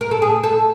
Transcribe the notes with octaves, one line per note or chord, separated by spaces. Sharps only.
A#4
A4
G#4
A4